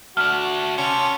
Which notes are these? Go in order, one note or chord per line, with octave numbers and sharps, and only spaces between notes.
A3 D4 F#4 F6
C3 C#4 A5